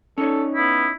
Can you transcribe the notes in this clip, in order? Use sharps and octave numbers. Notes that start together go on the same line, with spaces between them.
C#4 D#4 A4 C#5
B3 E4